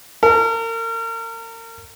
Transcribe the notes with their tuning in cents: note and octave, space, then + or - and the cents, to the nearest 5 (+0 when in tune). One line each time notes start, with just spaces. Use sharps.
A#4 -35